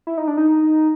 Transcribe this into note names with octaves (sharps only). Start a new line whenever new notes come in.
E4
D#4
D4
D#4